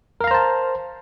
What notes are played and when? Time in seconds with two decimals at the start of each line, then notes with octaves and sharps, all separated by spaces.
0.21 A#4
0.24 F5
0.27 A#5
0.31 C5
0.34 A5